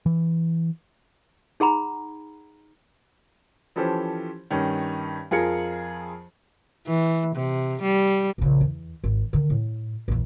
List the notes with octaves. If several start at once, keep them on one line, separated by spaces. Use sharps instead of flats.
E3
D#4 G#4 F#5 A#5 B5
E3 F3 C#4 G4 A4 C5
G2 D#3 C#4
F2 F4 G#4 A#4 C#7
E3
C3
G3
A#1 C#3
E2
G#1
D3 D#3
A2
A#1 E2